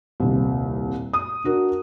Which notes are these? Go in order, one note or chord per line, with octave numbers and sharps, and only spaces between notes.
D#1 C2
D#6
D4 F#4 A#4